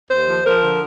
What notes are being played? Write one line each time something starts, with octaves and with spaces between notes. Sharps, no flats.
D#2 C5
F3
F3 A#4
D3